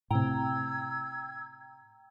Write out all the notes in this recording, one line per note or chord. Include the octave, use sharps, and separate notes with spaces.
A2 C3 G5 A#5 E6 G#6